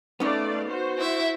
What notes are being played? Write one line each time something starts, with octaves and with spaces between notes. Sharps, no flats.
A3 B3 C#4 D#4 D5 F5
F#4 C5
E4 E5